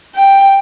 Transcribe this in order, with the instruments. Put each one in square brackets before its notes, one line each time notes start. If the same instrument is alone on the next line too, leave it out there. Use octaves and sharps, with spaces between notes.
[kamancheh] G5